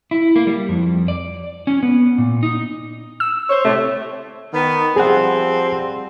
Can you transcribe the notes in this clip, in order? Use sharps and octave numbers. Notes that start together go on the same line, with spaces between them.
E4
A#3
G3
F2
D5
C#4
B3
A#2
D#4
E6
C5 C#5
A2 C3 A3
D#3 B3
F3 G3 C4 G#4 F#5